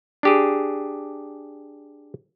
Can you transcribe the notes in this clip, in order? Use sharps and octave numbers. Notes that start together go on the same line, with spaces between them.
D4 G4 G#4